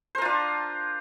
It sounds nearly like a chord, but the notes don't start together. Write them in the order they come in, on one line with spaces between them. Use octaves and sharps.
C5 A#4 F4 D4